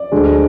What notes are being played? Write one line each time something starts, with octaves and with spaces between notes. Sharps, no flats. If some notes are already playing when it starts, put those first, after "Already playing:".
Already playing: D5
D2 D3 G#3